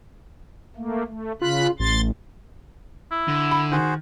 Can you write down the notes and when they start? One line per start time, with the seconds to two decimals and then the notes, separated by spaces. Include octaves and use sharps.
0.76 A3 A#3
1.07 A3
1.42 C#3 F4 B5 F#6
1.80 A1 C6 A6
3.12 E4
3.28 D3
3.51 B5
3.72 D#3 F#4 G#4 C5